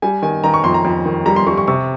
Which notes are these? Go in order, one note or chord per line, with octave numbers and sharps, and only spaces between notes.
G3 G#5
D#3 G#5
D#3 A#5
C#6
F2 C6
A#5
F2
D#3
G3 A#5
C6
G3 C#6
C#6
C3 C#6